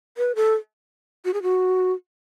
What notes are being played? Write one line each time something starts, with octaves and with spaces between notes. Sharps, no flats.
B4
A4
F#4
G#4
F#4